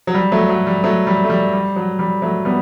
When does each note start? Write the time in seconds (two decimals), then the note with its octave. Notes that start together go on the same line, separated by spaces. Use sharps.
0.07 F#3
0.15 G3
0.32 F#3 A3
0.49 F#3
0.67 G3
0.83 F#3 A3
1.07 G3
1.24 A3
1.30 G3
1.53 G3
1.76 F#3
1.99 G3
2.22 F#3 A3
2.45 G3 B3